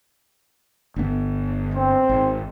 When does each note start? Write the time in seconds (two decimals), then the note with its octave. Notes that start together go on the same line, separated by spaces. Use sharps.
0.96 G1 B3
1.74 C4
2.09 G#1